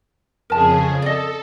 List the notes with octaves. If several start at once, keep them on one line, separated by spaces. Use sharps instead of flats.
F2 C#3 G#4 A#4 A5
A4 D5 D#5